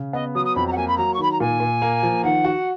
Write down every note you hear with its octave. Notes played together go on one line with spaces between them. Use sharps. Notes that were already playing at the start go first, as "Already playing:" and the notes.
Already playing: C#3
B3 D#5
F#3 D#6
D#6
F2 B5
A#5
F#5
A#3 G#5
B5
F#3 A#5
C#6
D#3 B5
A#5
A#2 G#5
A#2
A#3
F3
D#3 F#5
F#4